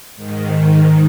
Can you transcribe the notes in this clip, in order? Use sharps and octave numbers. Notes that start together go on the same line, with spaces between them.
G#2 D#3